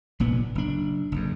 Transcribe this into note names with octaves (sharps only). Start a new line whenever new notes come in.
F1 A#2 B3
F#1 D4
F#1 F2